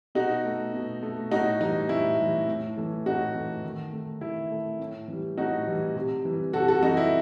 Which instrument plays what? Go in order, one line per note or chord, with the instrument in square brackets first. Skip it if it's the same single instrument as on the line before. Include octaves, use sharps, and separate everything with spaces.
[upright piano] B2 D#4 F#4
A3
B2
A3
A2 D#4 F#4
E3 G3 D#4
A2 E4
E3 G3
A2
E3 A3
A2 D#4 F#4
E3 A3
D#3
A3
D#3 E4
A3
A2
E3 G3
A2 D#4 F#4
E3 G3
C3
E3 G3
C3 F#4 A4
F#4 A4
E3 G3 D#4 F#4
E4